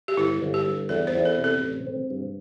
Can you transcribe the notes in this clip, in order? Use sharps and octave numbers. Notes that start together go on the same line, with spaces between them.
G4
G1 E4
G1
G4
G2
E2 A4
C5
E2
A4
C3
A4
A1
C4
G2